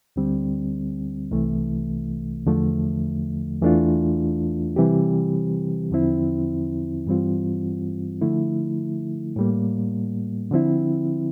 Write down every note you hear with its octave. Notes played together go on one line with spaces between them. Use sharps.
D2 D3 G3 C4
C2 C3 E3 A3
E2 D3 F3 A3
E2 E3 A3 D4 F4
C3 E3 G3 C4 G4
E2 D3 F3 C4 E4
G2 E3 G3 C4 F4
D3 F3 A3 E4
A2 G3 A#3
D3 F3 C4 E4